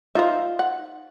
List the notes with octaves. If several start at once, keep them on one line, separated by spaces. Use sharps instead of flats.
D#4 F4 C5 E5
F#5